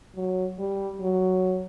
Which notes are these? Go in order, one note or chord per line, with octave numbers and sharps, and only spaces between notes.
F#3
G3
F#3